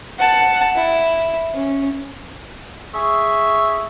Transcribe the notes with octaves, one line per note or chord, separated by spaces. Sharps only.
F#5 A5
E4
C#4
G#4 E5 C#6